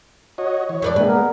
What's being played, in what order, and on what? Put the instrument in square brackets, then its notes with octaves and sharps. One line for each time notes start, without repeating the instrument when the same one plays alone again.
[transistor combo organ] F#4 C#5 D#5
E3 C#5
[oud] F2 B4 D5
[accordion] G2 C3 G3 [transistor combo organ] G#3 A#3 [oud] B4
[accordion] B3 A#4